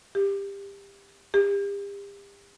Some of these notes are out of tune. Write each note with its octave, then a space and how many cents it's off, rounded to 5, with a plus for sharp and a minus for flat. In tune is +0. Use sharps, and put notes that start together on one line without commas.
G4 +20
G4 +40